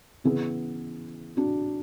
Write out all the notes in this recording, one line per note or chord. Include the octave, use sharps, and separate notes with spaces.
C#3 E3 B3 E4 G#4
D4 F#4